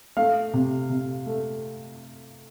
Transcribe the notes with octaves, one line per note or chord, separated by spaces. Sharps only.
A3 F5
C3
C3
A3